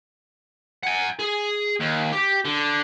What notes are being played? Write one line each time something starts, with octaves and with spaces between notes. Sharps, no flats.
F#5 G#5
G#4
D#2
G4
D3